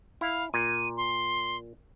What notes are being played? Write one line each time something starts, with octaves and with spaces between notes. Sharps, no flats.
E4 F5
A#2 D#7
C6